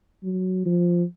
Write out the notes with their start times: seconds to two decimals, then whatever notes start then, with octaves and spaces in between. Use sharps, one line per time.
0.23 F#3
0.65 F3